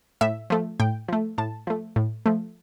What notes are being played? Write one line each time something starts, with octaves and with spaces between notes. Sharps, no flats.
A2 E5
F3 A3
A2 G5
F3 A3
A2 A5
F3 A3
A2
F3 A3